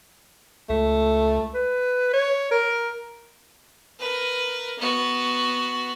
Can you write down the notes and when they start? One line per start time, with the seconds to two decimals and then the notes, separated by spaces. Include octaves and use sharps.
0.69 C#2 A3
1.54 B4
2.13 C#5
2.51 A#4
3.99 A#4 B4
4.79 B3 F#4